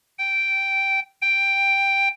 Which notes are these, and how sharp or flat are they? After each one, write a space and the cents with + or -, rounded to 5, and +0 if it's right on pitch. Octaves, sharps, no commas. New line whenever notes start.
G5 -5
G5 +5